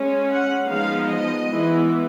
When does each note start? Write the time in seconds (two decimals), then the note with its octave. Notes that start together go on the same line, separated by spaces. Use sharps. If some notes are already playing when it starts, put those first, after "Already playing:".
Already playing: G#3 C#4
0.30 F#5
0.68 F3 G#3 B3 D#4 F5
1.07 D#5
1.46 E3 G#3 B3